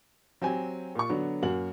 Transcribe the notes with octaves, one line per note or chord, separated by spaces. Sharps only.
F#3 C4 G4 G#5
A#2 C#6
D3 F#3 B3 D4 F#4
F#2 A#3 F#4 F#7